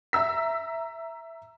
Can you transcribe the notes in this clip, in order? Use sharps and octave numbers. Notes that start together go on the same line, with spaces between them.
E5 A#5 E6 B6